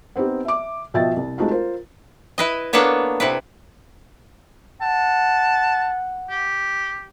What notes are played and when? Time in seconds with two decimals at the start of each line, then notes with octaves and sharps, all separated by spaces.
0.16 B3 C4 D#4 G4
0.45 E5 D6
0.94 B2 F3 D#5 E5 G5 A6
1.17 C2
1.38 G#3 A3 C4 D#4 F4 F#4
1.51 F4 A#4 C5
2.38 E4 B4 D#5
2.73 A#3 B3 D4 A4 B4 C#5
3.20 C3 E4 B4
4.81 F#5 A5
6.30 G4